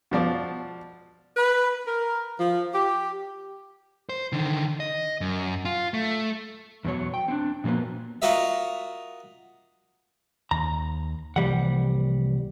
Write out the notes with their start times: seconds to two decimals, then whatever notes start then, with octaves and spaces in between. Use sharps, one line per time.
0.11 B2 F3 D5
1.37 B4
1.86 A#4
2.39 F3
2.73 G4
4.09 C5
4.33 D3 D#3
4.80 D#5
5.21 F#2
5.65 F4
5.94 A3
6.85 E2 B2 F#3 C#5
7.14 G5
7.28 C4 D4
7.64 A#2 F3 F#3 A#3 B3
8.22 F4 F#4 A#4 D#5 E5
10.51 D#2 A#5
11.36 C2 E3 F3 G3 A#3 F#5